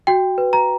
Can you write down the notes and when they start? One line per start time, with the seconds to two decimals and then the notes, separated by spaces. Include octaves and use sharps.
0.07 F#4 G5
0.38 B4
0.53 A#5